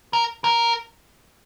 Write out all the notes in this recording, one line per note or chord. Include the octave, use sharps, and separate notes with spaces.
A#4
A#4